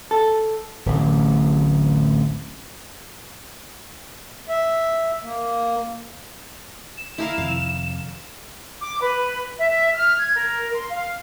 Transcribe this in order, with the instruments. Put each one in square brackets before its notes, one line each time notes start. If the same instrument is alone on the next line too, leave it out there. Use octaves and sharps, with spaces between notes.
[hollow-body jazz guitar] A4
[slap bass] D1 A1
[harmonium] E5
A#3
[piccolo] E7
[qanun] E4 A#4 F5
[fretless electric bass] F2 C3 D#3 [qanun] F5
[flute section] D6
B4
E5
F6
G#6
A#4
C6
F5